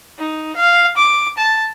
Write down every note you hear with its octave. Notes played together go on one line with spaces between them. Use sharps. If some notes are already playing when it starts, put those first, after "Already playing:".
D#4
F5
D6
A5